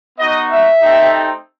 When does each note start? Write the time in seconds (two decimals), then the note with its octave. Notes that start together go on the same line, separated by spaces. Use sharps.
0.18 B3 D#4 F#4 D#5
0.49 E5
0.80 A3 C4 D#4 G4